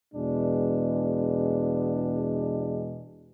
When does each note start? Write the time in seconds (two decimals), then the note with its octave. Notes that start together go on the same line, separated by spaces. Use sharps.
0.13 E2 B2 G#3 D4